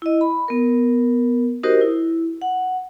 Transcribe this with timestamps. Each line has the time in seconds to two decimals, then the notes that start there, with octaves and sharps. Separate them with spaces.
0.02 E4 D#5
0.21 B5
0.48 B3 A#4
1.63 D#4 F#4 G4 A#4 C5 D#5
1.81 E4
2.42 F#5